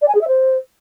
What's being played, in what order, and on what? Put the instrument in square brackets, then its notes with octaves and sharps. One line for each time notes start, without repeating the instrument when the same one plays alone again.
[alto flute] D5
G#5
G#4
E5
C5